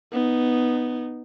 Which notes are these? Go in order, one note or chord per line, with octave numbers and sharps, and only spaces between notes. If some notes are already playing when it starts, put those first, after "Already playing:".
B3 D#4